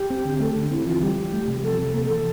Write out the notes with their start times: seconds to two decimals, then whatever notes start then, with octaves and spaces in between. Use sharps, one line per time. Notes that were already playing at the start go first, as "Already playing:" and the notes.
Already playing: G4
0.10 C4
0.25 D3
0.40 A3 A4
0.56 D3 D4
0.71 C4 E4
0.86 E3 F4
1.01 G3 G4
1.17 E3
1.33 A3
1.48 C3
1.63 F3 A4
1.79 C3
1.94 A#3 A4
2.10 E3 A4